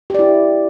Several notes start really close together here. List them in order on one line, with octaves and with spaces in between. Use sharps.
G4 D5 E4